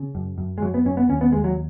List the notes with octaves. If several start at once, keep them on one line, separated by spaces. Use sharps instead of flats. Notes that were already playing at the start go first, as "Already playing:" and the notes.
Already playing: C#3
F#2
F#2
G#3
F#2 F#3
B3
F#2 C#4
B3
D#2 C#4
B3
D#2 G#3
F#3